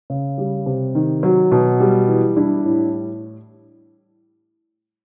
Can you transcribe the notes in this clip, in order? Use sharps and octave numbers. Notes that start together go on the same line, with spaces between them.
C#3
G3
C3
D#3
F#3
B2
G3
E3
G3 D4 E4
A2